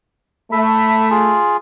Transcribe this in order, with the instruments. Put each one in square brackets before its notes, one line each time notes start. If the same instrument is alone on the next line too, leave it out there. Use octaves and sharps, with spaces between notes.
[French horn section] A3 [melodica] E5 B5
[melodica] F4 G#4